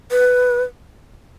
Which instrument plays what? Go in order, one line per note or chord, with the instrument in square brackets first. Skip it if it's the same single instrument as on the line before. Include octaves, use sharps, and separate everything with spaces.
[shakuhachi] B4